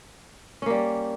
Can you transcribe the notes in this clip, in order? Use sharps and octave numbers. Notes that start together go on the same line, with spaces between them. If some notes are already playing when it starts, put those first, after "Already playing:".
G3 A#3 C#4